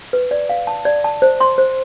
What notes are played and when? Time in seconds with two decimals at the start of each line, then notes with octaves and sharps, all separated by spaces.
0.13 B4
0.31 D5
0.49 F5
0.67 A5
0.85 D5
1.04 A5
1.22 C5
1.40 C6
1.58 C5